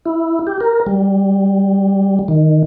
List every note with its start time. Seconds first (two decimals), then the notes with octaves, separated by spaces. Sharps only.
0.06 E4
0.47 G4
0.60 A#4
0.87 G3
2.28 D#3